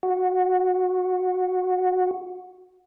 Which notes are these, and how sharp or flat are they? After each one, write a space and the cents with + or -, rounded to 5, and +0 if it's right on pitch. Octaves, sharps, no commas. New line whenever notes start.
F#4 -15